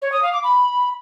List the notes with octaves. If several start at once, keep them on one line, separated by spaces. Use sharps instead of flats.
C#5
D#6
F5
D6
B5